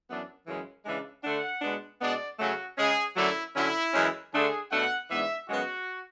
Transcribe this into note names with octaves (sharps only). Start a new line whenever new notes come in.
F#2 E3 B3 D4
F#2 C#3 E3 G#3 C#4
C#3 E3 G#3 D4
D3 A3 D4 F#5
B2 G#3 B3 D4
B2 G#3 B3 D4 D5
C#3 F#3 A3 C#4 F#4
C#3 G#3 C#4 G#4
F#2 D3 F#3 A3 E4
D3 F#3 C#4 E4
F#2 E3 G#3 C#4
D3 A3 D4 G#4
B2 A3 D4 F#5
G#2 E3 B3 D4 E5
F#2 C#3 G#3 B3 F#4